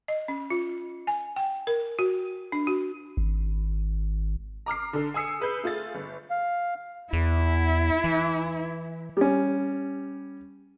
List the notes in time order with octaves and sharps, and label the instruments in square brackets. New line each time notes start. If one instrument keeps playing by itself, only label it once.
[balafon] D#5
C#4
F4
G#5
G5
A#4
F#4
D4
F#4
[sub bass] G#1
[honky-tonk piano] A#5 D6 F6 C7
D3 A4
G#5 D#6 E6 C7 C#7
G#4 B4 G6
A3 F4 G#4 A6
G1
[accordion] F5
[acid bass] E2 [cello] E4
[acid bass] E3
[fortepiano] G3 C#4